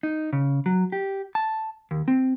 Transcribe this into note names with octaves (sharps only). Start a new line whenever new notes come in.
D#4
C#3
F#3
G4
A5
D#2
C4